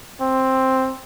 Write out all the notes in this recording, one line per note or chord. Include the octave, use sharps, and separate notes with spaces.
C4